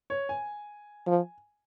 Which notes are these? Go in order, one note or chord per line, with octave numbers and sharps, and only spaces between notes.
C#5
G#5
F3